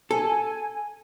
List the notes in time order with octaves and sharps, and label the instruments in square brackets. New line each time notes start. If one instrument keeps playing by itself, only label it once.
[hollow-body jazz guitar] A4 [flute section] G#5